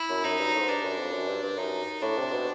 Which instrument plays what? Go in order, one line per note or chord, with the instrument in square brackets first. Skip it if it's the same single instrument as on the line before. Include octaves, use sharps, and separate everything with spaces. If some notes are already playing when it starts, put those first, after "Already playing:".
Already playing: [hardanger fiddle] E4
[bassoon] F#2
[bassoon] F#2 [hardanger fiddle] D#4
[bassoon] G2
A2
G#2
[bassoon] G2 [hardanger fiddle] D4
[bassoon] F#2
F2
F#2
G2
G2
[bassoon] F#2 [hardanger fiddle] D#4
[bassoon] A2 [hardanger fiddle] D4
[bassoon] C3
B2